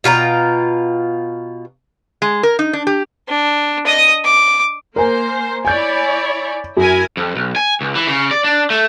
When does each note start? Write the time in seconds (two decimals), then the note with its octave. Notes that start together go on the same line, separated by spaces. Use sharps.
0.04 B2 F4 G5 A#5
2.22 G#3
2.43 A#4
2.59 D#4
2.73 D4
2.87 G4
3.28 D4
3.86 D#5 D#6
4.24 D6
4.96 A#3 A#4 C5 G#5
5.65 E4 C#5 D5 G#5 G6
6.77 F#2 E4 A#4 G#5
7.17 F2
7.36 B1
7.56 G#5
7.81 C#2
7.95 E3
8.07 C#3
8.31 D5
8.44 D4
8.70 A3